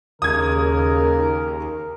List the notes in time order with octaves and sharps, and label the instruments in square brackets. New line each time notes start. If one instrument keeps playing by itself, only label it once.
[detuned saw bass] D#2 [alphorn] C#3 [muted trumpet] A#4 [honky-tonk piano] D#6 G#6